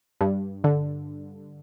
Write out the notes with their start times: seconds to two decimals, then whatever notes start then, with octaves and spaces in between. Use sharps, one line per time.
0.21 G2
0.64 D3